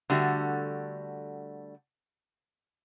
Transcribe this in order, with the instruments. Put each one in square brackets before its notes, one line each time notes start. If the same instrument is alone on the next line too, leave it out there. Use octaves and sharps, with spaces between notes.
[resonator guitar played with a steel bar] D3 G3 A3 F#4